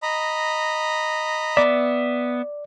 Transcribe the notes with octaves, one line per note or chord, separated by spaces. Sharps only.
D#5 A#5 B5
B3 D5 E5